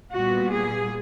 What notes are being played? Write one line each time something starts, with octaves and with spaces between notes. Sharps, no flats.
A#2 G3 B3 F#4
G#4